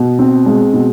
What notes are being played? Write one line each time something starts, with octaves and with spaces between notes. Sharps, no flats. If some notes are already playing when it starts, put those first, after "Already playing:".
Already playing: B2
C4
G#3
B2